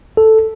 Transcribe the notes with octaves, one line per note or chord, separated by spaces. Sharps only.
A4